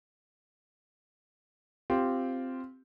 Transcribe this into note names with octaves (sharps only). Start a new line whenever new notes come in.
C4 F4 G4